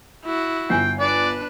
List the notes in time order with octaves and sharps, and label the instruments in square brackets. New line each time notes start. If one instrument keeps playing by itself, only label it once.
[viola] E4 F#4
[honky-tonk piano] G1 G#5 C7 [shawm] G5
[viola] D4 B4 [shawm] D5